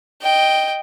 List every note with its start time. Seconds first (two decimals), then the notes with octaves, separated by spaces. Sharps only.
0.22 D#5 G5